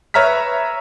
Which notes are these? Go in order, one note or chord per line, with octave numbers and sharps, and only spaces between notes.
B4 C#5 E5 A#5 F6 B6